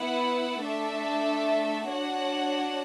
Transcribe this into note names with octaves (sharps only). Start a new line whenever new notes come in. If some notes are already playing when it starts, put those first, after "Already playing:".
Already playing: B3 E4 B4 F#5
A3 D4 A4 E5
D4 F#4 C#5 F#5